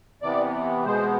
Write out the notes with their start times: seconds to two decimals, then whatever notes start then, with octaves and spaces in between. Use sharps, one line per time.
0.22 C3 E3 B3 D5
0.85 B2 G#3 B3 C5